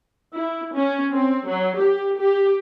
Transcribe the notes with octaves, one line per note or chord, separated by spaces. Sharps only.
E4
C#4
C4
F#3
G4
G4